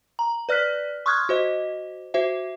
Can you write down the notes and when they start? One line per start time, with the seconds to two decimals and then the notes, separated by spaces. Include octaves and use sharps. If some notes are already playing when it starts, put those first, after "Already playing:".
0.19 A#5
0.49 B4 D5 F6 F#6 B6
1.06 C6 C#6 D#6 F6 F#6 G#6
1.29 F#4 C5 D#5
2.14 F#4 C5 E5